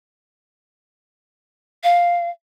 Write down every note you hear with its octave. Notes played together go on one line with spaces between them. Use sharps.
F5